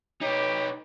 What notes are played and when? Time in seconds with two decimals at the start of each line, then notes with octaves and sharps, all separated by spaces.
0.21 D#4 G4 B4 C#5